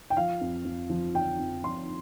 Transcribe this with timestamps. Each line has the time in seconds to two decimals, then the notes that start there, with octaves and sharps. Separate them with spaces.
0.10 G5
0.17 F3 F5
0.41 F2
0.65 F2
0.89 F3
1.14 F3 G5
1.39 F2
1.64 F2 C6